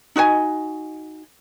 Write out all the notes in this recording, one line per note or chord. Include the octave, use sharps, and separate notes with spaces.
D#4 F#4 D#5 G#5